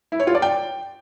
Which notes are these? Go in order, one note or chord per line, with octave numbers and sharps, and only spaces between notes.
E4
C#5
F4
D5
G5